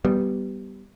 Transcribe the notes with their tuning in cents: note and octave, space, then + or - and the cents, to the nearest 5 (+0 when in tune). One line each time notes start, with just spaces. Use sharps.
G3 -10 B3 +0